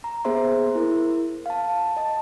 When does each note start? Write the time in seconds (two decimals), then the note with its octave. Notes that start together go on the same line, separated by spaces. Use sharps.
0.04 A#5
0.25 A#3 B3 G#4 C5 E5 C6
0.75 E4 A#4
1.46 F5 A5
1.97 D#5 A5